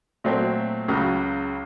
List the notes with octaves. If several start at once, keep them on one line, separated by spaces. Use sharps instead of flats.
A#2 F#3 A3 C4
C#2 C#3 F#3